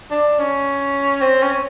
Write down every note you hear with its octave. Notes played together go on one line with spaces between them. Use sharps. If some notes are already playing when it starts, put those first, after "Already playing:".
D4
C#4
C4
C#4